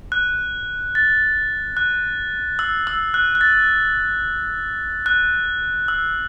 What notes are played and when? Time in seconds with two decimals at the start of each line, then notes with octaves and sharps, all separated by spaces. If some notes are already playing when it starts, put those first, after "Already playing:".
0.12 F#6
0.95 A6
1.77 F#6
2.59 E6
2.87 E6
3.14 F#6
3.35 F#6
3.41 A6
5.06 F#6
5.88 E6